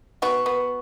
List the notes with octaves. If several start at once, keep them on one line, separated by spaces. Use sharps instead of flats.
B3 F#4
B3